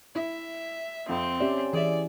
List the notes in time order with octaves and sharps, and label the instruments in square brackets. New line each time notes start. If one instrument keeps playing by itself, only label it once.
[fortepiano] E4 [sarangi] E5
[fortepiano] F2 [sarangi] C4
[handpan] C#4 G4 D5 [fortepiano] E5
[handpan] E3 [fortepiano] G#4 E5 [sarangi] D5